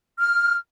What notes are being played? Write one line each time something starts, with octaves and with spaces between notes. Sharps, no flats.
F6